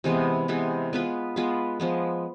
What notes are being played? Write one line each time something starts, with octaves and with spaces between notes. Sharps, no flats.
C3 E3 G#3 B3
C3 E3 G#3 B3
G#3 B3 F4 B4
G#3 B3 F4 B4
F3 G#3 B3